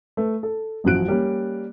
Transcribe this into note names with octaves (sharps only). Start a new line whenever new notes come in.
A3 B4
A4
A1 F#2 F3 F#3 F#6 D7
G3 A#3 C#4